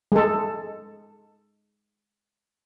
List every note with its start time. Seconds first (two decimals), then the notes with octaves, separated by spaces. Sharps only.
0.12 G#3 A4